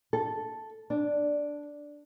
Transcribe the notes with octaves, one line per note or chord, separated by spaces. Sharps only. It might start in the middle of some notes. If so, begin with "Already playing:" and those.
A4
D4